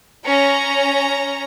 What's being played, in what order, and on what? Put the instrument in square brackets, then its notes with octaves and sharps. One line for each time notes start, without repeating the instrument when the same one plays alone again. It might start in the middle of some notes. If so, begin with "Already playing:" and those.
[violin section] C#4 A#5